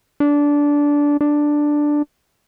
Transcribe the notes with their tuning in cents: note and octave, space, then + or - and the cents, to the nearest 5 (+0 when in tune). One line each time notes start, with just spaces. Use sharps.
D4 -15
D4 +5